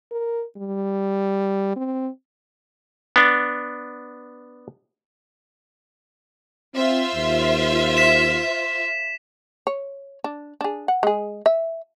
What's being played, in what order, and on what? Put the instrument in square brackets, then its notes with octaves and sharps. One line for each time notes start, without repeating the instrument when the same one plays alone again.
[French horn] A#4
G3
C4
[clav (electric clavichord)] B3 D4
[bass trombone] C4 [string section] F4 C5 E5
[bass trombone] D#2
[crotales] B6 E7
[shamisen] C#5
D4
D4 G#4
F#5
G#3 G#4
E5